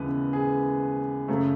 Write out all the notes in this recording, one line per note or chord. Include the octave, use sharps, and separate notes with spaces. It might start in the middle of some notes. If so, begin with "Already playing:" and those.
Already playing: D#2 C#3 E3 G#3 B3 B4
G#4
F#2 C#3 F#3 A3